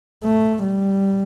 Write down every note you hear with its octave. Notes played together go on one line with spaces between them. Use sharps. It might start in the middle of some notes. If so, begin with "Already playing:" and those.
A3
G3